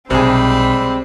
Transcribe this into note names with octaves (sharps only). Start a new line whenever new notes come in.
B1 C3 G3 G#3 C4 G#4 B5